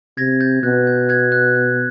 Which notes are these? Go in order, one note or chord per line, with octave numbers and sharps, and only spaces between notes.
C3 G#6 A#6
G6 A6
B2 F#6 G#6
G6
F#6 G#6
F#6
F#6